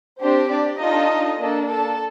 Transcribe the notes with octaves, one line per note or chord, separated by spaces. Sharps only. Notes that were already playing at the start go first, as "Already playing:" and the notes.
C4 D4 G4 C5
D4 D5
D4 D#4 F4 A4 D#5
A#3 D4 A4
A4 A5